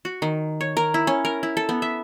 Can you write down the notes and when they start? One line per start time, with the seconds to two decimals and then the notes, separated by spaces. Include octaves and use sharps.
0.05 F#4
0.22 D#3
0.61 C#5
0.77 A#4
0.94 E4
1.07 C#4
1.25 A#4
1.43 E4
1.57 A4
1.69 B3
1.82 E5